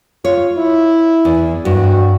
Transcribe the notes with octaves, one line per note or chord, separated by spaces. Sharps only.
F4 C#5
E4
E2
G2 F#4